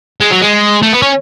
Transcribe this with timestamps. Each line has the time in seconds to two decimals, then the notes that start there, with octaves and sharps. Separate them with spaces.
0.20 G#3
0.30 F#3
0.41 G#3
0.83 A3
0.93 B3
1.02 C#4